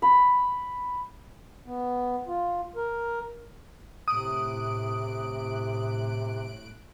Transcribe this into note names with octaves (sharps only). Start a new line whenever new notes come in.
B5
B3
F4
A#4
A2 C3 D#6 F#6 D7